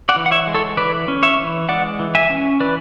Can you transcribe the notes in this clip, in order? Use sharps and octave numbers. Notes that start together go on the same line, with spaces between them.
D5 F#5
E3
F#5
C#5 E5
G#3
A4 C#5
E3 B4 D5
C#4
C#5 E5
E3
G#3 D5 F#5
E3
E5 G#5
C#4
E3 B4 D5